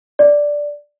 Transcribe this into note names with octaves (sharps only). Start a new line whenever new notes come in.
D5